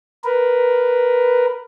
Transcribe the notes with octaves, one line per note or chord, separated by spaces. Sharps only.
A#4 B4